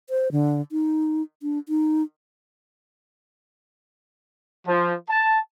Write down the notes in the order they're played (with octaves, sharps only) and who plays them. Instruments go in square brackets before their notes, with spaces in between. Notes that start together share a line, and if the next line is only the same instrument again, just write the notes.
[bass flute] C5
D3
D#4
D4
D#4
[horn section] F3
A5